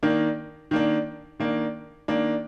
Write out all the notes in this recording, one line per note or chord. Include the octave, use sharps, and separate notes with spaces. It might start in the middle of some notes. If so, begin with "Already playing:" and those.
D#3 A#3 D4
D#3 A#3 D4
D#3 A#3 D4
D#3 A#3 D4